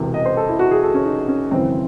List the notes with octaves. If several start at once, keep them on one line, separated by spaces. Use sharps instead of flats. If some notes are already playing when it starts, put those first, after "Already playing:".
Already playing: E1 E2 C3
D#5
C5
A4
E4
F#4
G#4
A4
C#4
D#4
C#4
G#1 F#2 C#3 E3 C4